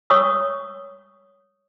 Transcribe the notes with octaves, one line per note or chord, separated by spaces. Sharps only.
C#5 C#6 D#6 E6